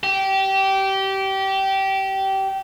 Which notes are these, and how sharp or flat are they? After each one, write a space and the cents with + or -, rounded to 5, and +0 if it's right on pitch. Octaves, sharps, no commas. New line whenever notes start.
G4 -20